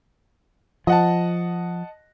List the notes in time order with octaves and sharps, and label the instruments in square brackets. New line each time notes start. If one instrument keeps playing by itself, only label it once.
[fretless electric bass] F3 [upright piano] D#5 F#5 A5